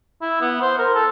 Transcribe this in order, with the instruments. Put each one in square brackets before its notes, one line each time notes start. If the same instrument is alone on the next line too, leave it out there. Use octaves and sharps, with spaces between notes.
[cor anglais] E4
B3
C5
A#4
A4